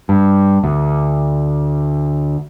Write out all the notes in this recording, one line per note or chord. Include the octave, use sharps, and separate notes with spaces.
G2
D2